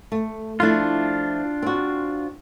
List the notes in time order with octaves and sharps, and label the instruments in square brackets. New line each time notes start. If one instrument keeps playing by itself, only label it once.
[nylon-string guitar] A3
[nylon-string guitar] F3 A3 E4 [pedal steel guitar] D4 F4
[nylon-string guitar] C4 F#4